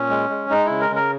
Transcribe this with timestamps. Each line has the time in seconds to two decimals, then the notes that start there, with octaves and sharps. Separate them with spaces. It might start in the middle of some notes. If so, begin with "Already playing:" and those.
Already playing: A#2 C#4
0.10 G#3
0.30 G#3
0.50 G#3 D#4
0.65 C#3 E4
0.81 A#4
0.90 C#3
0.96 A#4